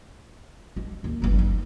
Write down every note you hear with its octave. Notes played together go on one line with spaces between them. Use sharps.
G#3
D#2
G1 F#2
D#4